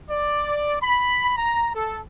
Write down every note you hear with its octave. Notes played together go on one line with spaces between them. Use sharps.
D5
B5
A#5
A4